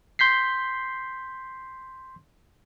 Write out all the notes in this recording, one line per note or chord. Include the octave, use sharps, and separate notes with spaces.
C6 G6 B6 C7